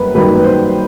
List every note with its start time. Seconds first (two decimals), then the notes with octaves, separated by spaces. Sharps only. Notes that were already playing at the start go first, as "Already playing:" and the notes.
Already playing: F#2 G3 A#3 B4
0.15 F#2 D#3 G3 A#3 D#4 B4
0.44 C5